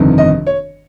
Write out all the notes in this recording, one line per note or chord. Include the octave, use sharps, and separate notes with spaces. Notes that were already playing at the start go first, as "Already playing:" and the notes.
Already playing: G1 F2 C3 D#3
D#5
C#5